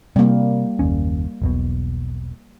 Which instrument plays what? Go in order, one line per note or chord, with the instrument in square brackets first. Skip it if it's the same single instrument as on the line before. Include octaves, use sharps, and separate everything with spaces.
[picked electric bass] C3 [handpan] G3 A#3
[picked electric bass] F#1 D#2 C#4
E1 B1 B2